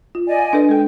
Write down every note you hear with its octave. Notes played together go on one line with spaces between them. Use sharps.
F4
D5 D#5 G#5
F5
D4 A4 B4
G#3 A4 G5